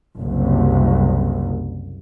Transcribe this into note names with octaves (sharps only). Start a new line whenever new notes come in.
F#1 C2